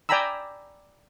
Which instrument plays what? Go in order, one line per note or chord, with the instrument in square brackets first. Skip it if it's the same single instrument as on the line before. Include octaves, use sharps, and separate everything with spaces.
[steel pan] D5 G5 G#5 A#5 B5 E6